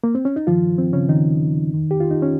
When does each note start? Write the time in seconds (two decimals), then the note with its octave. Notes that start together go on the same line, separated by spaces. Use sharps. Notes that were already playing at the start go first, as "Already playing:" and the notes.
0.04 A#3
0.15 C4
0.25 C#4
0.36 D#4
0.47 G2 D#3 F3 F4
0.78 C4
0.93 C#3 C#4
1.09 D#3 D#4
1.71 F2 D#3
1.91 G4
2.00 F4
2.11 D#4
2.22 C#4